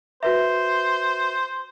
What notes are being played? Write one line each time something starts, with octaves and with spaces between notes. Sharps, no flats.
F#4 B4 C5 E5